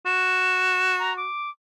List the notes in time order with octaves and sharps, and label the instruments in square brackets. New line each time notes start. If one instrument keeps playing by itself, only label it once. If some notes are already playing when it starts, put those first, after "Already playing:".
[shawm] F#4 [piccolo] E7
[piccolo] A#5
D6